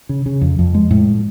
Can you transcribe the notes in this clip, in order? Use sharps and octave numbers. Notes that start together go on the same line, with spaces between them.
C#3
C#3
F2
F2
G#3
A2